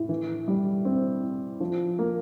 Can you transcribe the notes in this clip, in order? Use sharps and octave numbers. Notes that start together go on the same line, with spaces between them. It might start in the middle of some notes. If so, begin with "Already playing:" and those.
Already playing: A2
E3
G3
C4
E4
F3
A#3